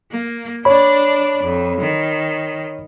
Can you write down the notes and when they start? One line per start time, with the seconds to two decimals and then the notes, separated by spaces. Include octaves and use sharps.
0.11 A#3
0.65 D4 C#5 D5 B5
1.43 F2
1.81 D#3